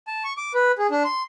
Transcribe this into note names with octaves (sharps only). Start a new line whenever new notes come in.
A5
C#6
D6
B4
G#4
D4
C6